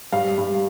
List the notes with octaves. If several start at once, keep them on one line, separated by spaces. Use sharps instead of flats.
G2 F5
G2